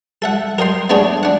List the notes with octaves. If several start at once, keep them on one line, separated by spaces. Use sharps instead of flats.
A4 E5 F#5
A#4 D#5 G5 C6
A3 B3 D4 G#4 C#5 D#5
D4 F#5